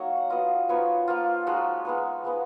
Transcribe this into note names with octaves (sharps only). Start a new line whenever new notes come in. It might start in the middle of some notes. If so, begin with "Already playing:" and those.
Already playing: F#3 A#3 D#4 C#5 D#5
F#5
F#3 B3 F4 D#5
F3 B3 D#4 C#5
F3 A#3 F4
F3 G#3 D#4 F#4
G#3 B3 D#4
F3 G#3 B3 D#4